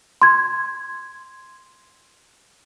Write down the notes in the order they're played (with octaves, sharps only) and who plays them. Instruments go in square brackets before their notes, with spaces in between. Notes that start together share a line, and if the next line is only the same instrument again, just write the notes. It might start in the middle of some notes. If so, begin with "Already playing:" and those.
[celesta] C6 G#6